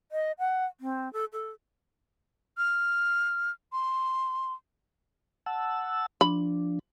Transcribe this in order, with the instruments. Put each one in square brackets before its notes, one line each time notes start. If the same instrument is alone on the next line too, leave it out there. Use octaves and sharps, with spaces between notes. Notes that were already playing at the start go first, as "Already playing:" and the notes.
[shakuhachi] D#5
F#5
C4
A4
A4
[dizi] F6
C6
[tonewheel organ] F#5 A5 E6
[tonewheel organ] F3 D4 [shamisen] B5